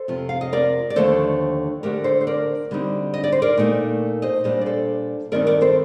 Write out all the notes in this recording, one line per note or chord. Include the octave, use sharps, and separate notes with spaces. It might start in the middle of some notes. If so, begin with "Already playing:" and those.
Already playing: A4 C5
F2 C3 F3
F5
D#5
A#4 D5
D5
D#2 D3 F3 A3 A4 C5
D3 A3 D4 G4 A#4
A4 C5
C5
A#4 D5
D2 D3 G3 C4 D#4
D#5
D5
C5
A#4 D5
A#2 A3 D#4
C5 D#5
A#2 G3 D4 C5 D#5
D5
A4 C5
G2 D#3 A3 C4 D#4 A#4 D5
A#4 D5
A4 C5